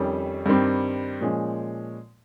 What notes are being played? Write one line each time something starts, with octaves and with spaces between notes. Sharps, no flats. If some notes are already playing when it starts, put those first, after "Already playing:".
Already playing: F2 D#3 G3 C#4
G2 D#3 G3 C4
A#2 F3 G#3 C#4